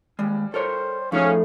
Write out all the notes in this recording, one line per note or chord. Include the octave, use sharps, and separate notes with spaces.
D#2 G3 G#3
A4 A#4 C5 C#5
A2 F3 C#4 D#4 G#4 F5